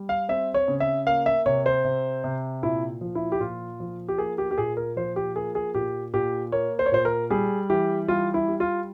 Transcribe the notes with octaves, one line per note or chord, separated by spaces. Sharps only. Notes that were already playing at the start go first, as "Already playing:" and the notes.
Already playing: G3
F5
C4 E5
C#5
C#3
E5
A#3 F5
E5
C3 C#5
C5
C3
C3
A#2 E4
F3
E4
G4
A#2 F4
F3
G4
A#3 G#4
G4
G4
A#2 G#4
A#4
F3 C5
G4
A#3 G#4
G#4
A#2 G4
A#2 G4
A#3 C#5
C5
C#5
A#2 C5
A#4
G3 G#4
E3 G4
G3 F4
E4
G3
F4